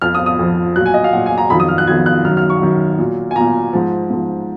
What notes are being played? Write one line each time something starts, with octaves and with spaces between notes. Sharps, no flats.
F2 F3 F6
D#6
D#6
F2 F3
A#2 F#3 F#6
G#5
D#5
F5
A#2 F#3 F#5
G#5
A#5
F2 D#3 F#3 B5
D#6
F6
F#6
F2 D#3 F#3 G#6
F#6
F#2 D#3 F#3 F6
F6
C#6
F#2 D#3 F#3
A#2 F#3
G#5
A#2 F#3 A#5
G#2 F3
G#2 F3